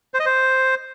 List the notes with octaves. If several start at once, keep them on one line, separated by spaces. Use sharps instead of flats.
C5
D#5
C5